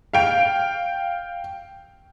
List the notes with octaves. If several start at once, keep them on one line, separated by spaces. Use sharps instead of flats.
F5 G5 D7